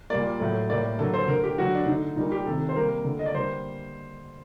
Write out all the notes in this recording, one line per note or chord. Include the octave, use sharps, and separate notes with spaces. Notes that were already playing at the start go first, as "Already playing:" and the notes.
A#2 G3 A#3 D5
A2 F#3 A3
A2 G3 A#3 D5
D3 F#3 A#3 A4
C5
D3 A3 A#4
G4
D3 F#3 A3 F#4
D4
D3 A3 D#4
A#2 G3 A#3 D#4
G4
C3 D#3 A3 A4
C5
C3 G3 A#3 A#4
D3 A3
D#5
D5
D3 G3 A#3 C5